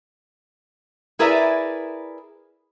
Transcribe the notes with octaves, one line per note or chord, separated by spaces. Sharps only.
E4 G#4 A#4 B4 D5 E5